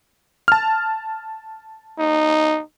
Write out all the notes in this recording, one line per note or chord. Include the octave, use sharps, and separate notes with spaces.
A5 F6
D#4